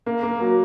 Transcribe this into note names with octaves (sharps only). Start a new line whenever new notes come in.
A#3
A#3
F#3